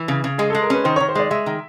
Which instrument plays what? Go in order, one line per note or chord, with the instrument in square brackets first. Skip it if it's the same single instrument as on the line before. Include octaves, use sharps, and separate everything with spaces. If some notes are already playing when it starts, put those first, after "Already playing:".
Already playing: [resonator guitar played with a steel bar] E3
C#3
C#3
[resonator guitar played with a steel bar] G#3 [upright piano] G#4
[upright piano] A4
[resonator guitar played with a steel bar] G#3
[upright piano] A#4
[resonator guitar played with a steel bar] C#4 [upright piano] B4
[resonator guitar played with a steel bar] D#3 [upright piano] C5
[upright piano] C#5
[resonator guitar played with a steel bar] D#3
[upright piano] C5
[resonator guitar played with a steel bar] G#3 [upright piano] D5
[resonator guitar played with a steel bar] G#3 [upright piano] E5
[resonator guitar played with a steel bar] D#3